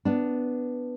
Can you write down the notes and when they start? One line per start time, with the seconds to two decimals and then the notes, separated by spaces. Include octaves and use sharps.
0.05 B3 D4